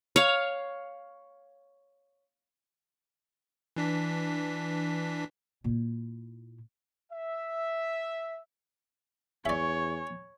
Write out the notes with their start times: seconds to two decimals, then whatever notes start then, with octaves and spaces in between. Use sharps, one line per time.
0.16 C#5 F5
3.76 E3 D4 B6
5.64 A#2 E4
7.11 E5
9.46 E2 C#5 D5 E5 G#5 C#6